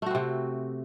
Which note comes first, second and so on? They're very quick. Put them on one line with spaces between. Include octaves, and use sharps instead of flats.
A3 F#4 C4 C3